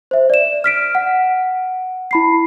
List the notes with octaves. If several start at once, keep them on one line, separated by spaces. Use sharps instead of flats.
C5 E5
D5 E7
F6 B6 D7
F#5
E4 B5 C7